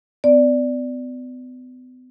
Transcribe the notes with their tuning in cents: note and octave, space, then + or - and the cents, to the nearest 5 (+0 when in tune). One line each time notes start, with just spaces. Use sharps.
B3 +45 D5 +0